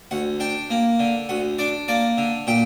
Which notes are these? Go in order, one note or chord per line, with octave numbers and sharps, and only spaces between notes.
D2 F#5
D4 G5
A#3
D3
D2 F#5
D4 D5
A#3 D5
D3
A#2 G5